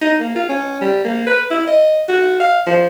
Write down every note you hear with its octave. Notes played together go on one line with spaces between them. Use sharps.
D#4
A#3
F4
C#4
G3
A#3
B4
E4
D#5
F#4
F5
F3